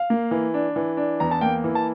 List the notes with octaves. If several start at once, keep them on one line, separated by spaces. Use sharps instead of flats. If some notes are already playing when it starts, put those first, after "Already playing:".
Already playing: F5
A#3
E3
D4
E3
D4
E2 A#5
A5
A#3 G5
E3
A5